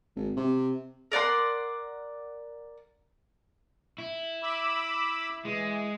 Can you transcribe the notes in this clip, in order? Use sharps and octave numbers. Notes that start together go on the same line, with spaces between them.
G#1
C3
A#4 D5 F#5 C6
E4
B5 D6 E6
E3 G#3